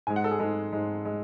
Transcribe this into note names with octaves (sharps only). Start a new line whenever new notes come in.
G#2 G#3 G#5
F#5
A4
G#4
G#2 G#3 A4
G#2 G#3
G#3